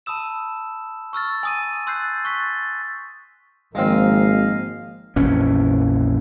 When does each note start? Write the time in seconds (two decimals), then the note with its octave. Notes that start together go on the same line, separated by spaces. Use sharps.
0.06 A5 B5 D#6 E6 E7
1.13 C#6 E6 F6 A6
1.43 G#5 D#6 D#7
1.87 C6 E6 F#6 G6 A6 C7
2.25 C#6 F#6 A6 B6
3.75 G#1 F3 G#3 A#3 C4 D#5 F5
5.16 A#1 F2 E3 C#4